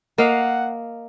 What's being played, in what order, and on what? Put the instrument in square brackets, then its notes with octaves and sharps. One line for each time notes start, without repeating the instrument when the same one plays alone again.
[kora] A#3 D#5 F5 [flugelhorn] F#5